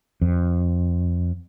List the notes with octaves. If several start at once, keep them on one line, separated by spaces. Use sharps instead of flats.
F2